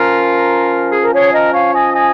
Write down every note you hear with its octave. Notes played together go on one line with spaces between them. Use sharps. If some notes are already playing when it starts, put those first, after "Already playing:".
Already playing: F3 C#4 F4 A#4
G#4
A#4
G#4 C#5
A#4 D#5
C#5 F5
D#5 G#5
D#5 G#5